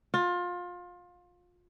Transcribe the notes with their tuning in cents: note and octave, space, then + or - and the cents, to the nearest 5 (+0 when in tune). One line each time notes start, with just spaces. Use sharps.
F4 +25